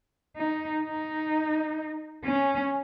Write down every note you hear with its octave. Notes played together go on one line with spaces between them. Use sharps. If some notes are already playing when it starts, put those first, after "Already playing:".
D#4
D#4
C#4